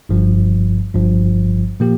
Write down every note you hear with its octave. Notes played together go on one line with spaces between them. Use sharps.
G1 G2 F3
G1 G2 F3
A#2 F3 A#3 G4